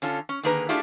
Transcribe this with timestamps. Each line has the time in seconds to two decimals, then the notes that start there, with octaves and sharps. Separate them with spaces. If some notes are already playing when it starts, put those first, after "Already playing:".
0.02 D3 C#4 F4 A4
0.29 C#4
0.43 D3 D#3 A#3 G#4 B4 A#5
0.69 A3 D4 E4 F4 G4 G#4